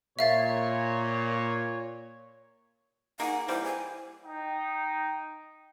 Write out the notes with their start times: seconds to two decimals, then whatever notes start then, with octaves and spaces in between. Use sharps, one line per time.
0.19 A#2 C#5 E5 F5 A6
3.20 A#3 D#4 G#4 F#5
3.48 E3 G3 A#3 C5
3.64 G#5
4.25 D#4 G5